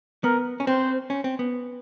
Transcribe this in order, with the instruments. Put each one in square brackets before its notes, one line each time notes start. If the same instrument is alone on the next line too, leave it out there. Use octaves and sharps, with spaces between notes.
[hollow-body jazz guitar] B3 [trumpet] A#4
[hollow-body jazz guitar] C#4
[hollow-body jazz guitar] C4 [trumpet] C5
[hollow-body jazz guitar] C#4
C4
B3